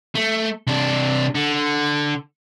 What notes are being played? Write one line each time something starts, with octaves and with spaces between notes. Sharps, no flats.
A3
C3 D4
D3